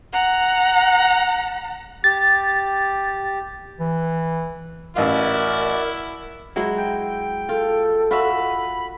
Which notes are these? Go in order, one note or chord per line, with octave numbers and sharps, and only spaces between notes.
F#5 A#5
G4 A6
E3
A1 E4 F#4 A#4 D5 E5 F5
F#3 G#3 E4
G5
F4 A4
F4 F#4 E5 B5